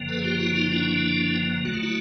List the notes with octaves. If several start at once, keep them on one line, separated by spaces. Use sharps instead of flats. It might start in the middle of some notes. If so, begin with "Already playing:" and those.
Already playing: G1 F#2 D3 F3 A#3
A4 B4
G#4
F4 G4
E4 F#4
D#4 F4
D4 E4
D#2 D3 F#3 A3 F#4
F4
E4 F#4